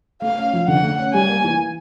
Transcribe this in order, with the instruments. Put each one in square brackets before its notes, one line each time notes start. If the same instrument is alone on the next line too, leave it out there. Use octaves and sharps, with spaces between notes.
[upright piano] A3 [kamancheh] F5
[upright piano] C#4
F3
[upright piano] D3 [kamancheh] F#5
[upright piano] A3
C#4
[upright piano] G3 [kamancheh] G#5
[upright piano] A#3
E3